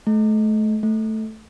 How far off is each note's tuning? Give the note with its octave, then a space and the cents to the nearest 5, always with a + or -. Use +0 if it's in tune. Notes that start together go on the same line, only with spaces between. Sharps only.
A3 -30
A3 +0